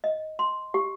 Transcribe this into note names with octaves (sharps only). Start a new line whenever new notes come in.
D#5
C6
G4